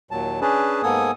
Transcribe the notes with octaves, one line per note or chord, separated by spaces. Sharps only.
D#2 A#2 F#3 A5
C#4 D4 G#4 B4 A5
G#2 A#3 B3 A4 G#5 D#6